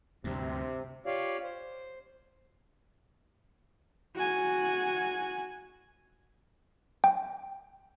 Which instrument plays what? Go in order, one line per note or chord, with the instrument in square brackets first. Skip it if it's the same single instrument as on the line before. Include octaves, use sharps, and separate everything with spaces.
[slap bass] D2 G2 [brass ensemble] C3
[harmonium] F4 G4 C#5 D5 F5
C5
[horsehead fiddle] F#4 G#5
[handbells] G5